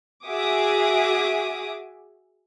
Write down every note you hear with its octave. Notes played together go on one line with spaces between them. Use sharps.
F#4 G#4 E5 G#5 D6 D#6